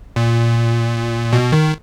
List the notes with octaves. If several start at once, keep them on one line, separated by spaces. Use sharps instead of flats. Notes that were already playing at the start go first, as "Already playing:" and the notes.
A#2
B2
D#3